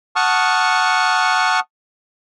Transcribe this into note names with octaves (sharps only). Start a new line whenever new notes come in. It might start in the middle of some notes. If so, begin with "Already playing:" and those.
F#5 A5 C#6 D#6 F6